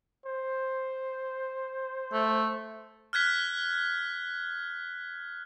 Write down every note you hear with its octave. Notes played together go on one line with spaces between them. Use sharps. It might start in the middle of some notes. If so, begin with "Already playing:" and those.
C5
A3
F6 F#6 G#6 B6